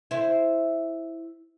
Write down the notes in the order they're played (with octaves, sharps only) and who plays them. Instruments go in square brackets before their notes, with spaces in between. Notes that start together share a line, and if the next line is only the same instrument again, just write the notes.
[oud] E4 C5